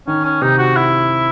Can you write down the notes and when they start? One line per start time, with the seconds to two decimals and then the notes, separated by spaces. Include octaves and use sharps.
0.07 D#3 C#4
0.25 C#4
0.42 C3 D#4
0.58 F#4
0.77 E4